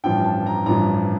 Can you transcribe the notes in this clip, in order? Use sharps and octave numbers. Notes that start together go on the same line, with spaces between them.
A1 G2 F3 G5
A5
A#5
A1 G2 F3 A#5